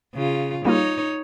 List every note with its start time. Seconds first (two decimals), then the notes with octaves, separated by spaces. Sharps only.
0.14 C#3 F4
0.65 G3 A#3 D#4 F4 C#5